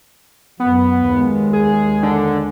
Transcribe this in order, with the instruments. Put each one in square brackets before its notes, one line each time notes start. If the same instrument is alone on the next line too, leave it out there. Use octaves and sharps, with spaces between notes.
[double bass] F#2 [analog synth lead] B3
[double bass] D#2 G#3
[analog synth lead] G#4
D3